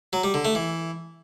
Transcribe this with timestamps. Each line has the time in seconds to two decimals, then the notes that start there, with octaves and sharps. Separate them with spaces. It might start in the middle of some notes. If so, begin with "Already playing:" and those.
0.13 F#3
0.24 G3
0.34 D3
0.45 A3
0.55 E3